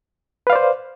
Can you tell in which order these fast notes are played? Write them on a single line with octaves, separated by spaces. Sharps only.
B4 F5 D5 C5